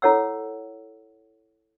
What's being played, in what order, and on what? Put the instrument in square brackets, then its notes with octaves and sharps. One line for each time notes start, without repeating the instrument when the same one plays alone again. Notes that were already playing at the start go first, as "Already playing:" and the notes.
[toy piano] E4 A4 C#5 F#5 E6